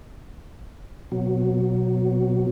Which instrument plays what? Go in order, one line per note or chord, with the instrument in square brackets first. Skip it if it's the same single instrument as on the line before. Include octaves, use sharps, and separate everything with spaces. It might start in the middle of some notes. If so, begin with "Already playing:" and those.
[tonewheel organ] B2 F#3